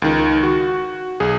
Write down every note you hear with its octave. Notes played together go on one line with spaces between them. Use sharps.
C#2 D#3
F#4
B1 G#4